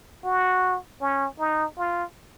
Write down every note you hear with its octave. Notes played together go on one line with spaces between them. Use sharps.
F#4
C#4
D#4
F4